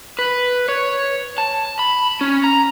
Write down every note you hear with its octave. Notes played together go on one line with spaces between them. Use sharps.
B4
C#5
A5
B5
C#4
A#5